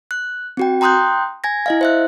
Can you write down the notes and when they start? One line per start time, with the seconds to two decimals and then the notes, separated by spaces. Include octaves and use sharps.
0.11 F#6
0.57 C4 F#4 G5
0.81 G5 A#5 C6 D#6 F#6 G6
1.44 G#5 G#6 A#6
1.66 E4 D#5 F5
1.81 C5 E5 F#6